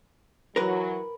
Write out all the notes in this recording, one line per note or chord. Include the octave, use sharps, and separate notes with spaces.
E3 F#3 A#4 B4